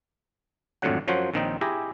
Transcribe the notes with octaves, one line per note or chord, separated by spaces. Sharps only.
G#1 F2 A2 D3 F#3 F#5
F#2 F3 F#3 C5 C#5 F#5
A#1 A#2 D#3 C4 D#4
E4 G4 G#4 A#5